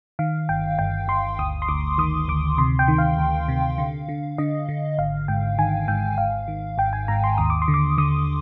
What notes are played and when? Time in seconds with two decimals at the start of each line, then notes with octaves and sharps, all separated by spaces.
0.19 D#3 F5
0.49 G1 G5
0.79 G1 G5
1.08 G1 C6
1.39 D2 D#6
1.62 C6
1.68 D2 D6
1.98 D#3 D#6
2.28 D2 D6
2.58 C3 C6
2.79 G5
2.88 D#3
2.98 F5
3.18 D2
3.48 C3
3.78 D3
4.09 D3
4.38 D3 D#5
4.69 D3
4.98 G#1 F5
5.28 G#2 G5
5.58 D#3 G#5
5.88 G#2 G5
6.18 G#1 F5
6.48 D#3
6.78 G#1 G5
6.93 G#5
7.08 G#2 A#5
7.24 C6
7.38 D#2 D#6
7.50 D6
7.62 C6
7.68 D3
7.74 D6
7.98 D3 D#6